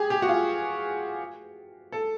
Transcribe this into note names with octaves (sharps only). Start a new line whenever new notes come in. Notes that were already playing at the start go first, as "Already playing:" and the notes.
Already playing: G4 G#4
G4
F#4
F4
A4